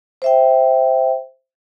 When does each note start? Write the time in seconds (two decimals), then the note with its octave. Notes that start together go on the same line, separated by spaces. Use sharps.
0.22 C5 E5 G5